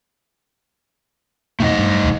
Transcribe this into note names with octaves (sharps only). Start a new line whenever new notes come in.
F2 B2 A3 D#4 D#5
G2
E1 D#2